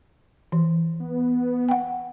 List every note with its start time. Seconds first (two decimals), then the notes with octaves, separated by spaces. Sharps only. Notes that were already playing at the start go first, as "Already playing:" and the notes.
0.52 E3
1.00 B3
1.69 F#5 G5